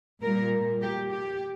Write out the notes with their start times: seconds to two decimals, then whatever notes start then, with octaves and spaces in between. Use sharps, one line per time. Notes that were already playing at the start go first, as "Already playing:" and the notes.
0.21 A#2 G3 A#4
0.82 G4
1.12 G4